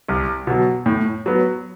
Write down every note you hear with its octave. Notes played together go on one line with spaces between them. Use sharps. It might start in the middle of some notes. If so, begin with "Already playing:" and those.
C2
B2 F#3
A2
F#3 B3